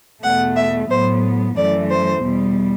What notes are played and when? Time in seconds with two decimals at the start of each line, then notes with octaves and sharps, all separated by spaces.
0.23 E2 B2 A3 F#5
0.56 E5
0.90 A2 F#3 B3 C5
1.56 F#2 E3 A3 D5
1.90 C5
2.22 E2 B2 G3